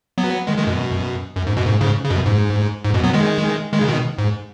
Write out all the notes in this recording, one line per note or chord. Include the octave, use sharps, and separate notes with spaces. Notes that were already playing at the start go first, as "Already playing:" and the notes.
F#3 B3
D#3 G#3
D#3 G#3
F#2 B2
F#2
G#2
F#2 B2
G#2
G#2 C#3
C#3
F#2 B2
G#2
G#2
F#2 B2
F#3 B3
D#3 G#3
D#3 G#3
C#3
B2 D#3
G#2